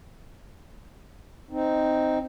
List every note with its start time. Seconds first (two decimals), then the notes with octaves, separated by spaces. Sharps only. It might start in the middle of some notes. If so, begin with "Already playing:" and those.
1.51 C4 D#4